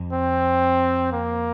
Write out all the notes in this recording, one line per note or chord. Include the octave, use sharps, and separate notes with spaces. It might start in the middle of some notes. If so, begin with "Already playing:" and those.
Already playing: F2
C4
A#3